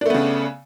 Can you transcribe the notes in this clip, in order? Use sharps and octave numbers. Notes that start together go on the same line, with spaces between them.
C#3 A3 B3 D4